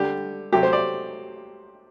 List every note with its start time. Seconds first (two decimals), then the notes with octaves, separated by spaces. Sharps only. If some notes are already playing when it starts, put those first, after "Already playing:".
Already playing: D3 G3 G4
0.53 C3 F#3 A3 G4
0.63 C5
0.73 D5